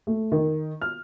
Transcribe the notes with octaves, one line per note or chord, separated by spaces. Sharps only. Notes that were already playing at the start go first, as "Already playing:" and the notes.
A3
D#3
F6